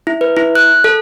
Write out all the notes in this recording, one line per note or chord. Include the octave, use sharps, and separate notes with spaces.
E4
B4
E4
F#6
A4